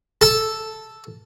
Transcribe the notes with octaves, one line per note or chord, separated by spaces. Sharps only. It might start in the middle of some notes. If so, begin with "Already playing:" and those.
A4